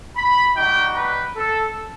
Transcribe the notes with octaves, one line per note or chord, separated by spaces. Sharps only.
B5
G3 D#4 F#4 G5
B4
A4